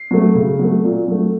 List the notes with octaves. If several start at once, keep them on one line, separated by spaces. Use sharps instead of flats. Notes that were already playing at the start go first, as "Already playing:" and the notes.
Already playing: C7
F#3 A3
C#3
F#3 A3
A#2
F#3 A3